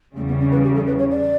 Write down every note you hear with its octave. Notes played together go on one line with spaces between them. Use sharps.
E2 C#3 G3 A3
B3
C#4
B4
G4
A4
B4
C#5
D5